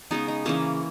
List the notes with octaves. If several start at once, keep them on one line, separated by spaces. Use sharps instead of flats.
C#3 G#3 B3 D#4
D#4
C#3 E3 A#3 C#4